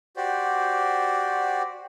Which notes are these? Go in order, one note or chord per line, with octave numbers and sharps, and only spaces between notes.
F#4 G4 C5 D5